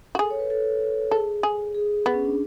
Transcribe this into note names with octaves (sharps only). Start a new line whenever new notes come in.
F#4
G#4 A4
C#5
B4
A4
G#4 A4
G#4
G#4
B3
C#4
D4